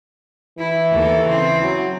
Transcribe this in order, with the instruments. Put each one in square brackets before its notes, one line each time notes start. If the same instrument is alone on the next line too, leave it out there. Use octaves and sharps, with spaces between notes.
[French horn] E3 [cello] E4
[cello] D#2 A4
C#3 C4
[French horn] F#3